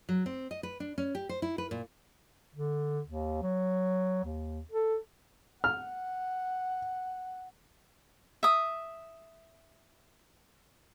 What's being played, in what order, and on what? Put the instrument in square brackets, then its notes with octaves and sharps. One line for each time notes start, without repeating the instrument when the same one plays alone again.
[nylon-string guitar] F#3
C4
D#5
B4
D4
C#4
G4
C5
E4
B4
A#2
[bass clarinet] D3
D#2
F#3
D#2
A4
[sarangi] F#5 [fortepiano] F6
[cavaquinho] E5 D#6